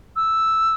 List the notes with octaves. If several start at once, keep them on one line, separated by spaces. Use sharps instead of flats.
E6